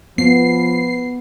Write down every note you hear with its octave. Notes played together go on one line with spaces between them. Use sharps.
F3 B3 C7